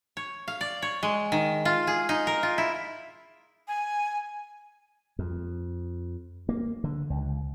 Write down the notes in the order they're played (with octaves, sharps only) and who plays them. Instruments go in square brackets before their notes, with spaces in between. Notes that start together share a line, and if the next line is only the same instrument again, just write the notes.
[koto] C#5
F5
D5
C#5
G#3
D#3
F4
G#4
D#4
A#4
F4
E4
[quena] G#5
[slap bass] F2
A#3
D3
C#2